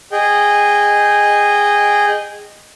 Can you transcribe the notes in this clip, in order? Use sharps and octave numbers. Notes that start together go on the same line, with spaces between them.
G#4 D#5 G5